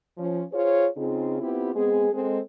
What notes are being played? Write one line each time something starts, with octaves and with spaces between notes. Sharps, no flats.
F3 C#4
F4 G#4 C5 C#5
C#3 C4 D#4 F4 G#4
B3 C4 E4 F4 G4
G#3 B3 C4 G#4
G#3 C4 A4